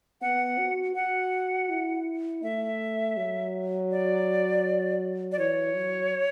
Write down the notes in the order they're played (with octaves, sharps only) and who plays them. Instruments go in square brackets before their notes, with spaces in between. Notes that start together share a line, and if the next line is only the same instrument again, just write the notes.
[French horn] B3 [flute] F#5
[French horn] F#4
[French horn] F#4 [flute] F#5
[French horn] E4
[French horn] A3 [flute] E5
[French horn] F#3
[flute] D5
D5
[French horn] E3 [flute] C#5
[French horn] F#3